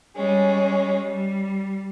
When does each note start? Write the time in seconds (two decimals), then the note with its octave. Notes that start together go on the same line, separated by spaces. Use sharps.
0.15 G3 G#3 C#4
1.01 G3